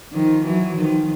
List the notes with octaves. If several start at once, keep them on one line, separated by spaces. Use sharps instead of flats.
D#3 F3
E3 F#3
D#3 F3